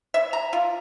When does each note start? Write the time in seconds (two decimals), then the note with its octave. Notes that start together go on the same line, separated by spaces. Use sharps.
0.14 E5
0.33 A#5
0.53 F4